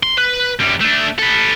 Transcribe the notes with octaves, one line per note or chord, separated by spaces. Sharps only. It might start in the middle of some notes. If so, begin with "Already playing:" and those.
C6
B4
F#2 G3
A3 D4
A4 B4